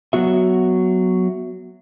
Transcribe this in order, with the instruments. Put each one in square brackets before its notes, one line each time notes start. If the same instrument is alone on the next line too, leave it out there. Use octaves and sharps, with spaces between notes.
[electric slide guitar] F#3 B3 F#4 E5